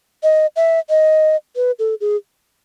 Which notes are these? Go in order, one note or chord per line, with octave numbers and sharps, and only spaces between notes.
D#5
E5
D#5
B4
A4
G#4